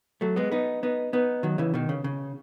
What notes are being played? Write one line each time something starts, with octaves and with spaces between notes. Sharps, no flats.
F#3 A3
G#3 B3
B3 D#4
B3 D#4
B3 D#4
D#3 F#3
C#3 E3
B2 D#3
C#3
C#3